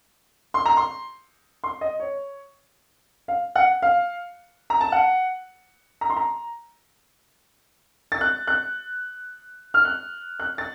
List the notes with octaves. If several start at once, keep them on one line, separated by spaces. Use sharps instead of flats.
C6
A#5
C6
C6
D#5
C#5
F5
F#5
F5
A#5
A5
F#5
A#5
C6
A#5
A6
F#6
F#6
F6
F#6
F#6
A6